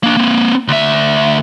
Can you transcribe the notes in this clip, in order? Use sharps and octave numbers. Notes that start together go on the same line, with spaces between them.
A#3 D4
A#3 C4
D2 E5